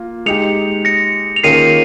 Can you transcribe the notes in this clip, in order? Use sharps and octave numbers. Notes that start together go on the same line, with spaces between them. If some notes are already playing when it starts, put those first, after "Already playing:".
Already playing: A#3 F4
G#3 D#4 G4 C#7 F7
A#6 C#7
F7
D#3 A#3 C#4 F4 G#4 C7 D#7